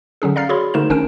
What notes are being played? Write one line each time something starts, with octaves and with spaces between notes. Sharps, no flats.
D3 F#3 C#4 G#4
D5 F5 A#5 F6 A6 C7
F#4 G#4 C#5 B5 C6
D3 A3 D#4 A#4 C5 E7
G#1 D#3 C#4 D4 A#4 D7